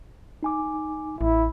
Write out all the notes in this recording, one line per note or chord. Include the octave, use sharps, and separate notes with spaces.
D#4 G#5 D6
A1 E4